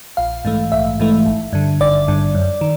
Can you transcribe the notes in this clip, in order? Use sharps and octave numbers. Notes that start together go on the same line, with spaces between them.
A#1 F5
G#2 E3 A3
A#1 E5
G#2 E3 A3
G#1
G2 D3
G#1 D5
G2 D3
F#2
D#3